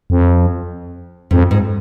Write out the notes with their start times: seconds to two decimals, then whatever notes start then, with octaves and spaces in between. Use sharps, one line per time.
0.10 F2
1.31 F2 G#2
1.51 G#2